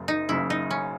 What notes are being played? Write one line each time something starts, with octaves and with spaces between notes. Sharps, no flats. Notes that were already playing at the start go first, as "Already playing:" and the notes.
Already playing: F#1 F#2 C#3
D#4
F#1 F#2 C#3 E4
D#4
C#4